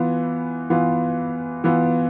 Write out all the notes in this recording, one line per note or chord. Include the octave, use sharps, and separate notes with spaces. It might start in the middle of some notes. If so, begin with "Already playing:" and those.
Already playing: E3 B3 F4
E3 B3 F4
E3 B3 F4